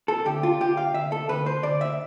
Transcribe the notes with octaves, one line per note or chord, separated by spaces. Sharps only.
A4
D2 G4
F4
D2 G4
F5
D2 E5
A4
D2 B4
C5
D2 D5
E5